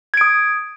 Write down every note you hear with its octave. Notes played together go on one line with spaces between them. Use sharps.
D#6 G#6 D7